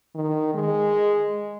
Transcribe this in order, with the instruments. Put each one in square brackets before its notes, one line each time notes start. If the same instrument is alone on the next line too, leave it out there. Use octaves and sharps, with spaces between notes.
[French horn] D#3
G#3